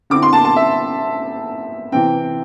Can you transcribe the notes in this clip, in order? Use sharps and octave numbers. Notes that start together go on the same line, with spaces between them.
D3 C4 E4 D6
C6
A5
A5
E5
C3 E3 C4 G5